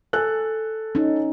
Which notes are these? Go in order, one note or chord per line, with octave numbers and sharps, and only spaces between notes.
A4 G#5 F#6
C#4 D#4